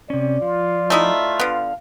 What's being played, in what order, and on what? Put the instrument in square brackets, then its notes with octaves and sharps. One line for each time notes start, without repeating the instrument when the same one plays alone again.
[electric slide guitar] C3 C#4 [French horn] D5
[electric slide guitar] F3 [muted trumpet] F4
[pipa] A3 D#4 E4
[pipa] D3 B3 [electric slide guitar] F5